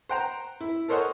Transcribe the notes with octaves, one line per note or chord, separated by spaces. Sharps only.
C5 F#5 G5 A#5
E4
A4 A#4 C5 C#5 D#5 F#5